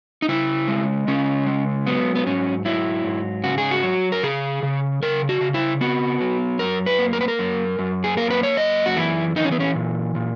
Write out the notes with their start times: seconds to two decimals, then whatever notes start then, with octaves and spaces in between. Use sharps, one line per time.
0.22 D#4
0.29 C#3 E4
0.68 G#3
1.07 C#3 C#4
1.47 G#3
1.87 F#3 B3
2.15 B3
2.26 G#2 C#4
2.65 F#3 E4
3.04 G#2
3.44 C#3 F#4
3.58 G#4
3.71 F#4
3.83 F#3
4.12 A#4
4.23 C#3 G#4
4.63 C#3
5.02 C#3 A#4
5.29 F#4
5.41 C#3
5.54 E4
5.81 B3 F#4
6.21 F#3
6.59 F#2 A#4
6.86 B4
6.99 A#3
7.13 A#4
7.21 B4
7.28 A#4
7.39 F#2
7.79 F#2
8.04 G#4
8.17 A#3 A#4
8.30 B4
8.43 C#5
8.57 F#2 D#5
8.86 F#4
8.96 E3 E4
9.36 E3 D#4
9.44 C#4
9.52 B3
9.60 C#4
9.75 A#2
10.15 A#2